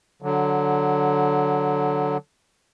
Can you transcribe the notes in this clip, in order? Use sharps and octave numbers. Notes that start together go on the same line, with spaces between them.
D3 F#3